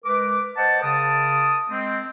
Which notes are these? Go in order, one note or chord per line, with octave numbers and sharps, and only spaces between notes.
G#3 A#4 B4 D6
C5 D#5 F#5 A5
C#3 A#4 A5 D#6
G#3 C4